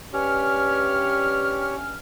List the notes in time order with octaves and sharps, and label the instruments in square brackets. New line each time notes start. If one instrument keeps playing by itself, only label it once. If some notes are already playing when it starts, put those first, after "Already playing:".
[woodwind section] G2 C#4 F6 [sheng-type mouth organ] G4 C#5